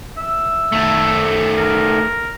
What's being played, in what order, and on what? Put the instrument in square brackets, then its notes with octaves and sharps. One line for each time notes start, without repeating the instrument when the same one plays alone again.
[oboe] E5
[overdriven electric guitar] D#3 A3
[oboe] A#4